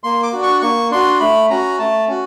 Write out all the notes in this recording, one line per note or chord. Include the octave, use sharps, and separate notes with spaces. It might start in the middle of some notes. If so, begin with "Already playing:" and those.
A#3 C6
D6
D4 F#4
C#6
A#3 C#6
D4 F#4 C6
A3 B5
C#4 F#4 A#5
A3 A5
C#4 F#4